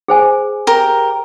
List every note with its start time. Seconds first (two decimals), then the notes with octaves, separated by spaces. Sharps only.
0.08 G#4 C5 G#5
0.67 G4 A#4